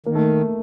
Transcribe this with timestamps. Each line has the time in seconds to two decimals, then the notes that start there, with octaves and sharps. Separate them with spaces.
0.06 D#3 A#3
0.15 A3